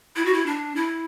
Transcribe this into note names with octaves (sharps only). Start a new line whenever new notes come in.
E4
F#4
E4
D4
E4